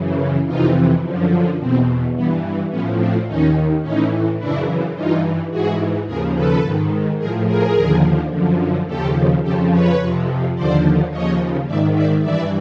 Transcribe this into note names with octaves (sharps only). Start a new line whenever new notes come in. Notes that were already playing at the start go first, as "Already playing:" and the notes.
Already playing: F#2 C#3 E3
F2 C3 E3 D#4 F4
F#2 D3 F3
E2 B2 C4
G2 E3 B3
A2 F3 B3 C#4
C4 D4
D#2 D#3 C#4 D#4
A2 E3 C#4 D#4
F#2 C#3 E3 D4 E4
G2 E3 D#4 F4
G#2 E3 F#4 G#4
D#2 C#3 F3 G#4 A#4
A4 B4
G#2 D#3
A2 F3 G#4 A#4
G#4 A#4
D#2 D3 F3
F#2 D3 F3
D#2 C#3 F3 G4 A4
F2 C#3 F3 G4 A4
B4 C#5
F2 C3 F3
D#2 D3 F3 C5 D5
D#2 C#3 F3 C#5 D#5
G#2 D#3 D5 E5
D5 E5
G2 E3 D5 E5